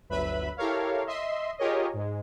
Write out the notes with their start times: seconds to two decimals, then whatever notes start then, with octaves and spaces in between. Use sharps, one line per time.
0.09 G1 D2 F#3 B4 E5 B5
0.57 E4 G4 A4 A#4 C#5 F5
1.06 D#5 E5 C6
1.58 F4 G4 G#4 A#4 C#5 D#5
1.93 G#2 G#3